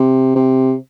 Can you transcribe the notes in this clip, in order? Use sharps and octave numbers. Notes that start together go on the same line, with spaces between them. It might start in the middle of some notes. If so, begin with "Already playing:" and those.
Already playing: C3
C3